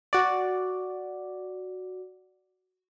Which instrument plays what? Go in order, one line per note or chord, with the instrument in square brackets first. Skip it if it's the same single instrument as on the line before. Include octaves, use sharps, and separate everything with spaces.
[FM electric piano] F#4 D5